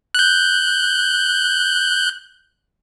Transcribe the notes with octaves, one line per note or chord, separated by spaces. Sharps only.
F#6 G6